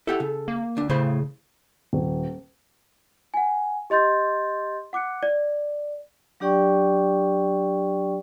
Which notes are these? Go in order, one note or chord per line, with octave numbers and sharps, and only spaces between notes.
E4 G4 A4 F#5
C#3
A#3
D2 D4
A2 C#3 C5 B5
D#1
F#5 G#5
G4 D#5 C6 G6 A6
F#5 D6 F#6 C#7
D5
F#3 D4 G4 D5 G5 C#6